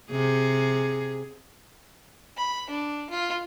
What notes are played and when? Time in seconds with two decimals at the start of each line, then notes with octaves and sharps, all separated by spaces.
0.11 C3 G#4
2.37 B5
2.70 D4
3.10 F4